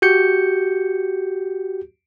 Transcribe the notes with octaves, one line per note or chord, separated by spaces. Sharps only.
F#4 G4 G6 C#7